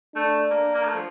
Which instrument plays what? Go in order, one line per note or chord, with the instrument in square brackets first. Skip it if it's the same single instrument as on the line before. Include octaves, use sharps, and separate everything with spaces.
[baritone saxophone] A3 [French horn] D4
[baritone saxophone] A#3
A#3
A3
F3